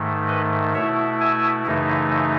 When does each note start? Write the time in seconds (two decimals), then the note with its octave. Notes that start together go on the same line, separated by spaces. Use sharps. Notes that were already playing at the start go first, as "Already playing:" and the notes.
Already playing: G#2 D#3 A3
0.28 B4 D#5
0.74 B2 A3 E4 C#5 E5
1.20 E5 G#5
1.66 F#2 C#3 E3 A3 D#4